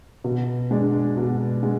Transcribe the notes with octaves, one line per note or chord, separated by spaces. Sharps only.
B2
G#3 D4
B2
G#3